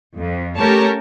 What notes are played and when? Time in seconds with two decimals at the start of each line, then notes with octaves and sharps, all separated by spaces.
0.16 F2
0.58 A3 C#4 G4 A#4 C#5 A5